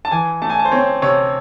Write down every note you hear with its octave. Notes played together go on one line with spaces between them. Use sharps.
A5
E3 G#5
A3 A5
G#5
A5
C5
C4 C#5
C3 C#5